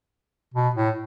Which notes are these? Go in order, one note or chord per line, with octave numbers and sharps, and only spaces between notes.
B2
A2